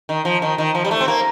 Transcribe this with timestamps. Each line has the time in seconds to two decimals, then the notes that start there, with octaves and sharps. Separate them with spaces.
0.09 D#3
0.25 F3
0.42 D#3
0.58 D#3
0.75 F3
0.85 G3
0.91 A3
1.01 C4
1.08 A#3